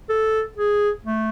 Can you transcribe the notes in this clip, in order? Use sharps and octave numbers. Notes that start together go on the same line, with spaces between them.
A4
G#4
A3